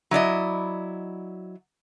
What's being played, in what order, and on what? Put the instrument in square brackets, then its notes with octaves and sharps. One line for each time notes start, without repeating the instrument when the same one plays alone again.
[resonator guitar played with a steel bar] F#3 E4 D5 D#5